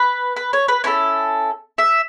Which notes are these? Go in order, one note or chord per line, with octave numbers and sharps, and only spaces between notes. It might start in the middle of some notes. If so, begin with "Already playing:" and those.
Already playing: B4
B4
C#5
B4
C#4 E4 A4 C#5
E5